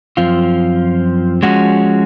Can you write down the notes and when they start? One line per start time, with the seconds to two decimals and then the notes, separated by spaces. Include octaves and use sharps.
0.17 F#2 F3 C4 F4
1.43 F3 G#3 C#4 F#4